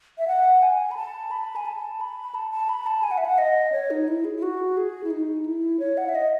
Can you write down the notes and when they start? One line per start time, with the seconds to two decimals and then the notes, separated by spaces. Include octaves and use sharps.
0.18 E5
0.28 F#5
0.63 G#5
0.91 B5
0.97 A5
1.31 B5
1.56 G#5
1.66 A5
2.01 B5
2.35 A5
2.51 A5
2.69 B5
2.86 A5
3.03 G#5
3.11 F#5
3.18 E5
3.25 F#5
3.38 D#5
3.72 C#5
3.90 D#4
4.08 E4
4.25 G#4
4.36 E4
4.42 F#4
4.77 G#4
5.04 E4
5.10 D#4
5.46 E4
5.80 C#5
5.97 F#5
6.09 E5
6.15 D#5